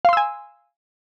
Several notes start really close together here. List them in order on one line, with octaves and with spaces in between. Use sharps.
F5 C6 E6 G#5